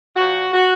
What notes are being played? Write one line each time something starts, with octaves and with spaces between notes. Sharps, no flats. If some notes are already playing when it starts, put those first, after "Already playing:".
A#2 F3 F#4
F#4